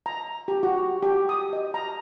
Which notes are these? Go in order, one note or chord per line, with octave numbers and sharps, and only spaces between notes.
A#5
G4
F#4
G4
D#6
D#5
A#5